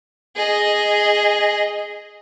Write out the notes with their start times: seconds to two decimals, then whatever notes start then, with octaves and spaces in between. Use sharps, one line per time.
0.36 G#4 D#5